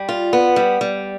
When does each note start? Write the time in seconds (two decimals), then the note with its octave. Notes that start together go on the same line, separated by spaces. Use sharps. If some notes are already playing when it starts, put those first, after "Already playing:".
Already playing: G3
0.09 F4
0.33 B3
0.56 G3
0.81 G3